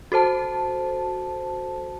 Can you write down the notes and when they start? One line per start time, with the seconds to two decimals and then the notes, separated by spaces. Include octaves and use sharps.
0.12 F#4 A4 C5 A5